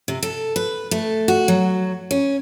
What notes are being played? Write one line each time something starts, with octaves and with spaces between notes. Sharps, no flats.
C3
A4
B4
A3
F#4
F#3
C#4